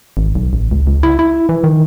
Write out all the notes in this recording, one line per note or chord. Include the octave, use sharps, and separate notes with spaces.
G#1
B1
A1
C#2
C#2
E4
E4
E3
D#3